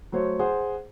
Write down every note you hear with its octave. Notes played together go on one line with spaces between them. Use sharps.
F#3 A3 C5 C#5
G#4 C5 F#5